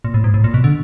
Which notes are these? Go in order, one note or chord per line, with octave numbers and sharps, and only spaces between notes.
A#2
A2
G#2
A2
A#2
B2
D3